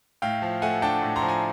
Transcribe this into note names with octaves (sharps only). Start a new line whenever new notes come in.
A2 F5 G5
F3
A3 F#5 G#5
D4 G5 A5
A2
A#5 C6
F3
G#5 A#5